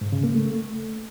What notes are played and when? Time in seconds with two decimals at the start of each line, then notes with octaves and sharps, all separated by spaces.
0.01 G#2
0.12 C#3
0.24 A#3
0.35 A3
0.46 A3